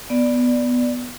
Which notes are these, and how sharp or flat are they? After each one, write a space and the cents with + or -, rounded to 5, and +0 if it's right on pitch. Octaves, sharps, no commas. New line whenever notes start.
B3 +0 D5 +0